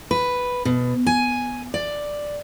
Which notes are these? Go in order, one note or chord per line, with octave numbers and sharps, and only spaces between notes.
B4
B2
G#5
D5